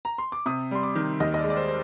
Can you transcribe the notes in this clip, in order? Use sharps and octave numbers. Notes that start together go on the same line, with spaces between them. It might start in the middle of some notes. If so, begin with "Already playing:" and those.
A#5
C6
D6
C3 D#6
G3 C6
D6
D#3
D#2 D#5
D#5
D5
G#3
D5
C5
C5